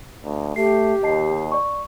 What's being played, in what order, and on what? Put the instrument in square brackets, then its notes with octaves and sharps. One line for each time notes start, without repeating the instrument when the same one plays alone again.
[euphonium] D2
[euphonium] A3 [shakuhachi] G4 [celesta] C7
[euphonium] D#2 [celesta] D#5 A5 C7
[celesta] D5 C#6